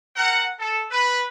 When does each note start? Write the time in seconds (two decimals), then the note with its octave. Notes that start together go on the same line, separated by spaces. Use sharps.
0.16 C4 A#4 F#5
0.59 A4
0.91 B4